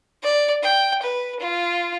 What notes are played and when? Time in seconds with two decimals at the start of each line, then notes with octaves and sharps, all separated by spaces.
0.23 D5
0.63 G5
1.02 B4
1.40 F4